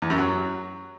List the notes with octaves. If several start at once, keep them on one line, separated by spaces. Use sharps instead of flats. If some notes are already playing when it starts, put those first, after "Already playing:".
E2
F#2
F#3